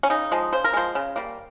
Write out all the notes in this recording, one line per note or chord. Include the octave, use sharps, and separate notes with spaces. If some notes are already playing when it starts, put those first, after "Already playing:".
C#4
C#3 D#4
F3 G#3
C#3 C5
A#4
F3 G#3 C5
C#3
G3 A#3